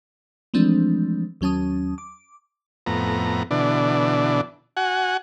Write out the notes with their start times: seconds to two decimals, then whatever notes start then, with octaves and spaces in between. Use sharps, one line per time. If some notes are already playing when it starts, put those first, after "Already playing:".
0.54 E3 F3 G#3 A3 C4 D4
1.41 D#2 F#3 C#4 A5 D#6
1.98 D6
2.86 F2 A2 B3 A#5
3.51 B2 D3 E3 D4
4.77 F#4 F#5 G#5